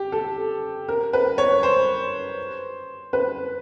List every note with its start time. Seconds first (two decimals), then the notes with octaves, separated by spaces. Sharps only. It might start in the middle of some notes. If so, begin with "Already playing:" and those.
Already playing: G4
0.12 A4
0.88 A#4
1.13 B4
1.38 C#5
1.63 C5
3.13 B4